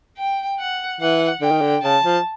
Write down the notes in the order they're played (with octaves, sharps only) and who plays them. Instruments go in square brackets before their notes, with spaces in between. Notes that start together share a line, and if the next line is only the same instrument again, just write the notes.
[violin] G5
F#5
[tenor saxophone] E3 [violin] F#5
[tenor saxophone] D3 [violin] G5
[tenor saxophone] D#3
D3
[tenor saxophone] C#3 [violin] A5
[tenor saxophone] F3